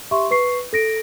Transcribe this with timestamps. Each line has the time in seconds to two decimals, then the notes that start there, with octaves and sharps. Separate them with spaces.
0.11 G4 E5 C6 C#6
0.31 B4 C#6 C7
0.73 A4 A#6 D7